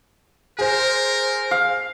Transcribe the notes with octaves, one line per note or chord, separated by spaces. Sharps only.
G#4 A#4 C5
F5